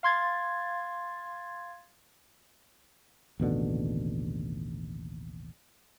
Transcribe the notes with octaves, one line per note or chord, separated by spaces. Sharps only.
F5 C6 G#6 A6
A1 D#2 B2 D3